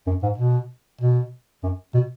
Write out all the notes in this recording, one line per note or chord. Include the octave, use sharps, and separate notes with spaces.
F#2
G#2
B2
B2
F#2
B2